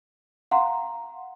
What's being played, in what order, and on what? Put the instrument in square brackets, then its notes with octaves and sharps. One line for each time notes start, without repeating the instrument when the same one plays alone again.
[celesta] F5 F#5 A#5 C6